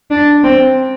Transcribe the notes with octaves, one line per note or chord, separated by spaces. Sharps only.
D4
C4